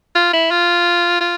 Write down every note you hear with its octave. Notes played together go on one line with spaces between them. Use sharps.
F4
E4
F4
F4